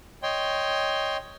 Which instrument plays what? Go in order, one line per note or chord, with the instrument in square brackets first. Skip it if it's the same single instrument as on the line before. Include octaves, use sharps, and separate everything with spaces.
[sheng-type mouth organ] C#5 D#5 G5 C6